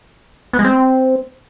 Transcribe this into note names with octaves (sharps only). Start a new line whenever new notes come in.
B3
G#3
C4